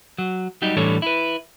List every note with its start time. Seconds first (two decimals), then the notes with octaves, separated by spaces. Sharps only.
0.18 F#3
0.62 F#3 G3 D#4 G4
0.77 A2 E3 G3 D4 A4 C#5
1.02 E4 B4